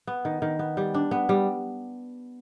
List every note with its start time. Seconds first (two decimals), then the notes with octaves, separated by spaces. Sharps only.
0.07 B3
0.25 D#3
0.42 D#3
0.59 B3
0.77 G3
0.94 D4
1.11 B3
1.29 G3